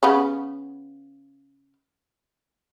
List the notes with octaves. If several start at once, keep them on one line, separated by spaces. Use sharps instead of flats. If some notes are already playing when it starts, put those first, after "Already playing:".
C#3 B3 C#4